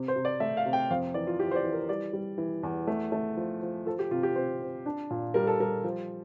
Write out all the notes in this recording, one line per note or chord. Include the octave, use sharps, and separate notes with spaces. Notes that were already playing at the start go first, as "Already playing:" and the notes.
Already playing: C3
C5
C3
D5
A3 E5
F5
C3
G5
F2 F5
E3 D5
F4
E3 G4
C5
D5
E3
A#4
G3 D5
G3
E3
E2
A3
A3
F3
F3
F3 A4
G4
C3 F4
G4
C3 C5
C4
D4
A#2
G3 A#4
A4
G3 A#4
F3